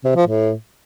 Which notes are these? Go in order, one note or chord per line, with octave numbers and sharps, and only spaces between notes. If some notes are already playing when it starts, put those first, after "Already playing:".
C3
F3
A2